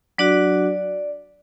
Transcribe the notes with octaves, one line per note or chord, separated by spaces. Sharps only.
F#3 D4 F#4 D5